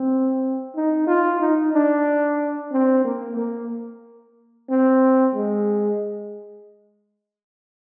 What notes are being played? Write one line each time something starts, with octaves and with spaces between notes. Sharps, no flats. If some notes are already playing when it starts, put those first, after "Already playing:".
Already playing: C4
D#4
F4
D#4
D4
C4
A#3
A#3
C4
G#3